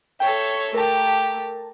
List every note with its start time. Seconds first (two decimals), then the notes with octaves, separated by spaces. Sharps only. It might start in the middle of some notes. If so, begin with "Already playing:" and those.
0.20 A4 C#5 E5 G5
0.74 A3 G4 A#4 A5